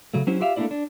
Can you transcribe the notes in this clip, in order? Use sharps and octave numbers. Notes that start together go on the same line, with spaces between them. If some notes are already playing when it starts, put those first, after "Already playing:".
C#3 F#3 A3
F#3 C#4 E4 G4 C5
F4 G4 E5 F5
A3 A#3 C4 D4 E4 D5
D4